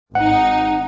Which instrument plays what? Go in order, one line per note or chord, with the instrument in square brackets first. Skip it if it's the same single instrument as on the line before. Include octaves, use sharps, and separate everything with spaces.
[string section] G#1 D#4 [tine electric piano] F#5